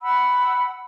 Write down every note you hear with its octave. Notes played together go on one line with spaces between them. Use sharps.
F#5 B5 E6